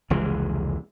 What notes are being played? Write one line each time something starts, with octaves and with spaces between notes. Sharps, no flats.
F1 C#2 E3 G#3